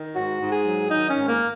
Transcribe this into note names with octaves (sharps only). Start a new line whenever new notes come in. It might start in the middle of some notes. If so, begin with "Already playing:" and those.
Already playing: D#3
G#2 F#4
G#2
G#4
F#3
D#3 D#4
C#4
G#2
A#3